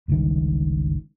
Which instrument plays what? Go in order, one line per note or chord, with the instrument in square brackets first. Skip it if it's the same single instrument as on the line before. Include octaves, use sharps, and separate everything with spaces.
[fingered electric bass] G1 C#2 G2 D#3